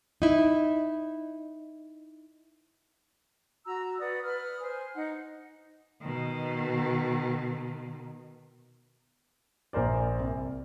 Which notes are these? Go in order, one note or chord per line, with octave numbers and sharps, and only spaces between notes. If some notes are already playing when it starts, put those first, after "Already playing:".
D#4 E4
F#4 A#5 E6
B4 D5 F#5 D#6
B4 D#6 F6
C5 G#5
D#4 F#5
B2 D#3
A#1 A#4 C5 D5
C2